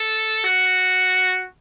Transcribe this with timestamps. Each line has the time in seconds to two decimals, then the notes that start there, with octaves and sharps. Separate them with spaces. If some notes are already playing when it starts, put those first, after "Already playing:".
Already playing: A4
0.45 F#4